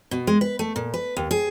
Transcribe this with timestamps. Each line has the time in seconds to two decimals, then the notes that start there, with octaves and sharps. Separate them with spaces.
0.11 B2
0.27 G#3
0.41 B4
0.59 A3
0.76 A#2
0.94 B4
1.17 D#2
1.31 G#4